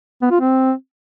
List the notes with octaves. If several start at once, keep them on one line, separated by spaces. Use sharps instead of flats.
B3
F4
C4